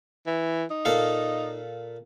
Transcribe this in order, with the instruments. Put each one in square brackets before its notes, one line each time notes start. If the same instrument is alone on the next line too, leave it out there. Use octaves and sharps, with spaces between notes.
[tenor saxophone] E3
D#4
[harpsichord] A#2 A4 F5